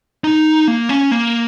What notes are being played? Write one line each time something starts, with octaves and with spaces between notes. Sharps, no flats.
D#4
A#3
C#4
A#3